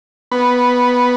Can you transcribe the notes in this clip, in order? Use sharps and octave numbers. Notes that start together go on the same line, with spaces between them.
B3